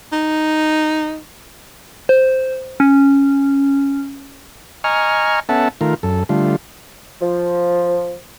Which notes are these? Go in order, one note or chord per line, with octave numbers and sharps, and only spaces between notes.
D#4
C5
C#4
D#5 G#5 A#5 C#6 F6
B3 C#4 A4 E5 F#5 A5
D#3 A3 F4 A#4
F#2 A4
D3 G3 A3 F4
F3